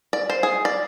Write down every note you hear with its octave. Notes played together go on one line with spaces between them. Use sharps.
D5
C5
G#4
D5